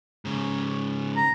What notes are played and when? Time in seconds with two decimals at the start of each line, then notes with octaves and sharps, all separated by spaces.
0.25 G#2 C#3
1.17 A#5